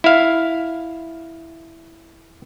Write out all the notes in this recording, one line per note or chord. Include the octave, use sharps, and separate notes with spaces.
E4 F5